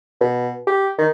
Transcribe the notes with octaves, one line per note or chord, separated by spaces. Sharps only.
B2
G4
D#3